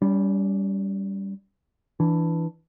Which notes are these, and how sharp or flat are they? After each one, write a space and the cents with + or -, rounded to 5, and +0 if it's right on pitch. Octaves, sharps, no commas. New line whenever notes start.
G3 +0 C#4 +45
E3 +0 D4 +0